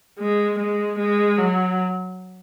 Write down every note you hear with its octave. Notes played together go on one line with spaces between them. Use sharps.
G#3
G#3
G#3
F#3